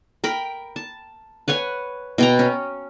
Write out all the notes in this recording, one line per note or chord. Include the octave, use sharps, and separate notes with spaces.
A#4 G5 B5
A5
B4 C#5 F#5 G#5
B2 G5 A#5
C#4